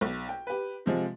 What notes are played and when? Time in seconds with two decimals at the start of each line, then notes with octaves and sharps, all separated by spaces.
0.01 B1
0.29 G5
0.47 G4 B4
0.86 C3 F3 G#3